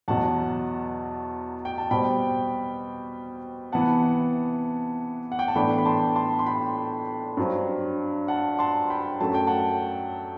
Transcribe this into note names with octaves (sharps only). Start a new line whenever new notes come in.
E2 B2 F#3 F#5 A5
G5
A5
B2 G3 C4 G5 B5
C3 E3 B3 F#5 A5
F#5
G5
A5
A2 E3 B3 D4 G5 B5
B5
A5 C6
A5 C6
C6
G5 B5
G2 F#3 C4
F#5 A5
A5 C6
G5 B5
F#2 F#3 A3 A5
G5
F#5 A5